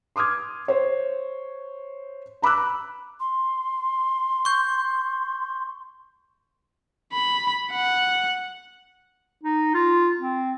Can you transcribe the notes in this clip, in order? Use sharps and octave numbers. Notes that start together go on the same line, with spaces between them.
C6 D6 D#6 F6 G#6
C5 C#5
A#5 B5 D6 E6 F#6
C6
C#6 G6
B5
F#5
D#4
F4
C4